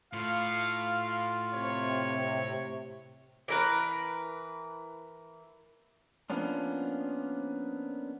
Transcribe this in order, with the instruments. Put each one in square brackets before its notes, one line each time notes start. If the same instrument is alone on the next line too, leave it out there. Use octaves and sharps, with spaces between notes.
[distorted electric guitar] A2 [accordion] F4 [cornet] F5
[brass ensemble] C3 [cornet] C#5
[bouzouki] E3 A#4 B4
[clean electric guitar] F3 A#3 B3 C#4 D4